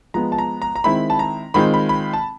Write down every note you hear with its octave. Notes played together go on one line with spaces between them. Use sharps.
F3 G#3 B3 A#5
A5
A#5
A#5
A#5
D#3 G#3 C4 E4 B5
A5
A#5
D#3 G#3 C4 F4 B5
B5
B5
A5